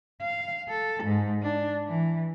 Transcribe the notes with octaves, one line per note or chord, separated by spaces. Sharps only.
F5
A4
G#2
D4
E3